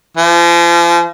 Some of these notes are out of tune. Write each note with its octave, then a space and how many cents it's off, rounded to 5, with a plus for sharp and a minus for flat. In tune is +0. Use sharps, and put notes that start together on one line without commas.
F3 -35